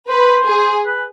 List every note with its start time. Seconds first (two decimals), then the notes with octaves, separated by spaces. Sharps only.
0.09 B4 C5
0.47 G#4
0.86 B4